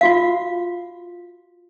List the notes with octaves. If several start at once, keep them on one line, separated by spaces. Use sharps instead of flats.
F4 F#4 F5